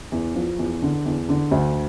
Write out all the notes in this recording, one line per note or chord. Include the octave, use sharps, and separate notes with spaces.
E2
F3
E2
D3
E2
D3
D2